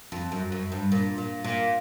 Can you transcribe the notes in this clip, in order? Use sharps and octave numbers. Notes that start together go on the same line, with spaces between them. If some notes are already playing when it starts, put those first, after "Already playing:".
F2
F#2
F#2
G2
A#2
A#2
A#2